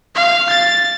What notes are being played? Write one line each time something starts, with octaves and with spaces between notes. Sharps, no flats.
F5
A6